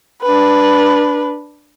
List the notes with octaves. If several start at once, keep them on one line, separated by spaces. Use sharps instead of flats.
D4 B4